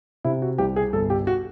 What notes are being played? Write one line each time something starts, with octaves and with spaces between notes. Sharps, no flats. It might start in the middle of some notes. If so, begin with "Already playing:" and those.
C3 E4
F#4
C2 G4
G#4
G1 A4
G4
F#4